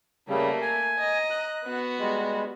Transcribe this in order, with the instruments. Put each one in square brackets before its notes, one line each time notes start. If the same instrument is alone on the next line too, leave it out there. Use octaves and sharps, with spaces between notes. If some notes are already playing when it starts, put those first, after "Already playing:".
[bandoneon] C#3 G3 [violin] A3 A#3
[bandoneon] G#5
[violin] D#5 A#5
[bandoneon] F#6
[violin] B3 F#4
[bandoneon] G3 G#3